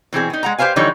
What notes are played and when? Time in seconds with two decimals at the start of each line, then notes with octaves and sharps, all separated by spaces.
0.13 B2 E3 C4 G#4
0.30 B3 D#4
0.43 G#3 F#5 A#5
0.58 G4 B4 C5 F5 G#5
0.76 D3 E3 F3 G3 D#4 C#5